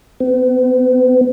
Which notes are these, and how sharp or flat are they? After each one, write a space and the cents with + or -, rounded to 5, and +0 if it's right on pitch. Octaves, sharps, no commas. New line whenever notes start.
B3 +45